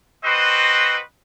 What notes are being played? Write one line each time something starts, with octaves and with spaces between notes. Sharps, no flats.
C4 F#4 B4 C5 D#5